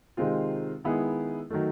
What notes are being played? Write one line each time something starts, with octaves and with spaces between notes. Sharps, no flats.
C3 D#3 G#3 C4 F4
D#3 G#3 B3 E4 G#4
D#3 F#3 A3